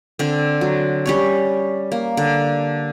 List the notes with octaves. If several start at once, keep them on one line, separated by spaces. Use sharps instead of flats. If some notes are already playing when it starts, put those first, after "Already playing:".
D3 C4
F#3
G3 C#4 C#5
A#3
D3